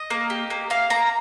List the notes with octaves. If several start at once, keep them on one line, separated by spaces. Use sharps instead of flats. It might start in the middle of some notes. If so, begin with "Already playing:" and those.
Already playing: D#5
A#3
G4
A#3
A#3 F5
A#3 A#5